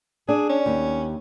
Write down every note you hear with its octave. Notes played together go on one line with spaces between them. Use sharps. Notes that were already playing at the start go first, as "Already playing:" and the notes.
D4 G#4
C#4
D#2